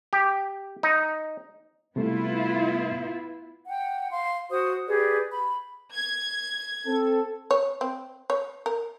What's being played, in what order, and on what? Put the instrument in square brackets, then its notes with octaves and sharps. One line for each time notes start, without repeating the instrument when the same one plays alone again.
[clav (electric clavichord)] G4
D#4
[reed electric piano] C3 G3 A3 [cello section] B3 E4 F4
[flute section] F#5 G5
F5 C6
F#4 C5 D#6
G4 G#4 B4 D5
B5
[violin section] G#6
[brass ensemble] C4 A4
[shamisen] C#5
C4
C#5
A#4